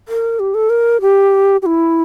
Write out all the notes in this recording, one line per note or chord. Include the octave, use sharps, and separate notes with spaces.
A#4
G4
A4
A#4
G4
G4
E4